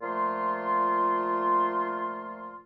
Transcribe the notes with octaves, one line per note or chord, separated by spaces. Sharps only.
A#2 F3 A3 F4 C6